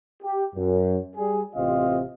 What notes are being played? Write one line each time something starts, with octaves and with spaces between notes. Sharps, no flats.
G4
F#2
G3 G#4
A1 C3 C4 F4 D#5 F5